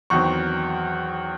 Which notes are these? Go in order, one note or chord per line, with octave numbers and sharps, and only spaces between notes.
E2 D#3 F#3 C4 C#6